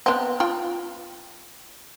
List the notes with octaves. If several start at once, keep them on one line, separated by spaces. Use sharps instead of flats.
B3 C4
F4 G5